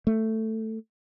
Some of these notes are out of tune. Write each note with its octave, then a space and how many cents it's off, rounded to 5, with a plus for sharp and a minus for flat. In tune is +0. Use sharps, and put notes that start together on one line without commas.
A3 +10